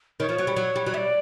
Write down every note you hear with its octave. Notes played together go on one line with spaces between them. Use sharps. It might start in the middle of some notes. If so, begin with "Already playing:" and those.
D#3 C#5
F3
F#3
G3
F#3
G3
F#3
G3 D5 E5